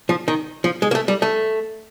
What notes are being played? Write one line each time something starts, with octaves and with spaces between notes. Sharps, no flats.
F3
D#3
F3
G#3
A#3
A3
G3
A3